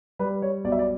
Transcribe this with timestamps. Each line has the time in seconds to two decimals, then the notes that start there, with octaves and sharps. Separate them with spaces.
0.19 G3 B4
0.42 C#5
0.64 B1 D5
0.72 E5
0.79 D5